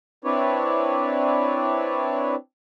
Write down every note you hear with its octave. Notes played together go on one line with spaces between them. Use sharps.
C4 D4 E4 B4 C#5 D5